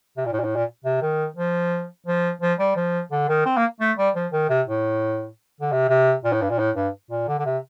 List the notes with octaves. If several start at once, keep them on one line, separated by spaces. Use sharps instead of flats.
C3
A#2
A2
A#2
A2
A#2
C3
D#3
F3
F3
F3
G3
F3
D3
D#3
C4
A#3
A3
G3
F3
D#3
C3
A2
D3
C3
C3
A#2
A2
G2
A#2
A2
G2
A#2
D3
D3
C3